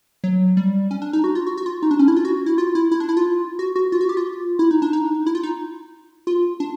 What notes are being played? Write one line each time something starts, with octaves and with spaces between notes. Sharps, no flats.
F#3
G3
C#4
D4
D#4
F#4
F4
F#4
F#4
F4
D#4
D4
C#4
E4
F4
F#4
E4
F4
E4
E4
D4
E4
F4
F#4
F#4
F4
F#4
G4
F4
E4
D#4
D4
D#4
E4
F4
D#4
F4
D4